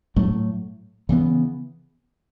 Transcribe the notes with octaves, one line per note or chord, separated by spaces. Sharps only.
A2 F#3 A3
C#3 E3 B3